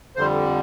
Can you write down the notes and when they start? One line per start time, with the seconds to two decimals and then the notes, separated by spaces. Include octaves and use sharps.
0.16 F2 D3 G3 C5